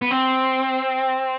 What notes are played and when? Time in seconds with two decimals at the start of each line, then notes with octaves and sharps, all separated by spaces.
0.02 B3
0.11 C4